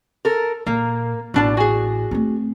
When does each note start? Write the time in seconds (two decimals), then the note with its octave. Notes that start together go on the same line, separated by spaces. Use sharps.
0.25 A4 A#4
0.67 A#2 A#3
1.34 A1 B2 D4 A5
1.57 F#4 G#4
2.11 A3 C4